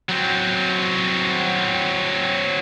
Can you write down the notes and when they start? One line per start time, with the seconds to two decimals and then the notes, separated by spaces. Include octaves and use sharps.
0.09 F#3 C4